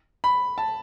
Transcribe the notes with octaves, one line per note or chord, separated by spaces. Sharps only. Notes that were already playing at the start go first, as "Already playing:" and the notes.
B5
A5